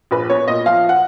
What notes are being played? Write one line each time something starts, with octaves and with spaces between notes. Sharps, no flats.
A#1 B4
B3 C#5
A#2 D#5
F3 F5
F#5